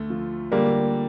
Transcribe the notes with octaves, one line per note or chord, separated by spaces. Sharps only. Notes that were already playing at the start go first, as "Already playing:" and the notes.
Already playing: D2 A3
F3
D3 G3 A#3